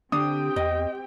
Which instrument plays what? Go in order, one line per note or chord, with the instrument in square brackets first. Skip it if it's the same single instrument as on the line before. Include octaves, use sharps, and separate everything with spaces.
[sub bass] D3 [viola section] C4 G4 G5 [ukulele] D4 [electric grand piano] D#6
[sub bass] E2 [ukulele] D#5